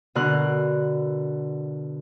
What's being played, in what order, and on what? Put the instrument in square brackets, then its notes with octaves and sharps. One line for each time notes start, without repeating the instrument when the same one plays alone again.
[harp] B2 D3 A#4 F#6